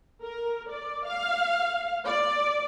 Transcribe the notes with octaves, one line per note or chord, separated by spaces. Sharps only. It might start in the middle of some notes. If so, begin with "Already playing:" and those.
A#4
D5
F5
D5